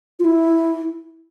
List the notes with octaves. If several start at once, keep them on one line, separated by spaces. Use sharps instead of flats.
F4
E4